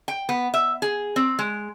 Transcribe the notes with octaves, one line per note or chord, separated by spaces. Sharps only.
G5
B3
E5
G#4
C4
G#3